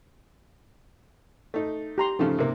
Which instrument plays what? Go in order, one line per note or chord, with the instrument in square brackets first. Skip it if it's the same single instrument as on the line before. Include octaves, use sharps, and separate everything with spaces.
[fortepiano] A3 D#4
[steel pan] G4 A#5 C6
[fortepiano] C#3 F3 A3 [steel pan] D#4
[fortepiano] C3 A#3